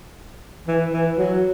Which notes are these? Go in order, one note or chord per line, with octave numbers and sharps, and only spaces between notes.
E3
E3
F#3